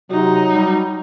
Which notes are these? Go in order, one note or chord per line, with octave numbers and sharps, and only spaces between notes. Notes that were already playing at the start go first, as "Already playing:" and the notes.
C3 F#3 D#4 F#4
G3